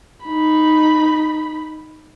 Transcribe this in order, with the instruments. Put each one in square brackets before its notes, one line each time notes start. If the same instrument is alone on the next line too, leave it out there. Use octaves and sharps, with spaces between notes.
[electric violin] D#4 B5